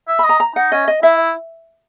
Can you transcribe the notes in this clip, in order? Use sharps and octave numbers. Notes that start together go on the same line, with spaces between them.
E5
B5
D#5
A#5
A#5
D#4 F#5
C#4 D#5
D#5
E4 E5